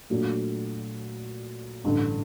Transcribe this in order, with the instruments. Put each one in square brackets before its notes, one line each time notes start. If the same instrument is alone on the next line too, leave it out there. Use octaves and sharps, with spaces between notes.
[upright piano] A#2 F#3 A3 D4
A1 G2 D3